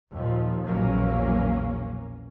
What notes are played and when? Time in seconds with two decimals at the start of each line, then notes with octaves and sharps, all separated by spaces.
0.11 D#2 A#2 F3
0.66 A#1 E2 B2 F#3 A#3 C#4